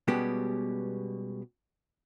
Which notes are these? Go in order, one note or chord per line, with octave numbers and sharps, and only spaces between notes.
B2 G3 G#3 B3 C#4 G4